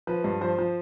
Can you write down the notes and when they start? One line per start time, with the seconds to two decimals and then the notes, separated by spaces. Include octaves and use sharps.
0.07 F3 B4
0.24 G2
0.41 F3 C5
0.59 F3